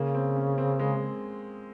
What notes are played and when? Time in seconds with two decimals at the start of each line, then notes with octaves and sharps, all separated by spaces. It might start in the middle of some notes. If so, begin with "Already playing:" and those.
Already playing: C#3 A#3
0.14 C4
0.36 C#4
0.58 C4
0.79 G#3